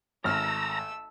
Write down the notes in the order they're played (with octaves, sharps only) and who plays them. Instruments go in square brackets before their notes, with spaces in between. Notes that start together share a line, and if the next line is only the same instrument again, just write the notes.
[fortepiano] G#1 F6 [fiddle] A3 E6 [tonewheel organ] A#5